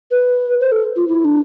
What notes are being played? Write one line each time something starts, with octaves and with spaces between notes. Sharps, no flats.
B4
C5
A4
F4
E4
D4